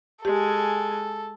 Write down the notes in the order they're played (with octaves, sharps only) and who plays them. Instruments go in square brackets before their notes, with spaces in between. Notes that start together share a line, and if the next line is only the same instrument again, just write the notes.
[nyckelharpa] G#3 G#5 [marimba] G4 [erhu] A4